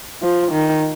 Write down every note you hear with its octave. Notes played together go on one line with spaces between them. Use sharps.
F3
D#3